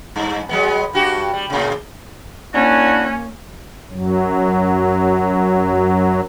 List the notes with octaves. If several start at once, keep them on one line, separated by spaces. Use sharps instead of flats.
G2
F#3 G#3 B3
G2 F#4 G4
G3
A2 C#3
A#3 C#4 D4 E4 F#4
F#2 F#3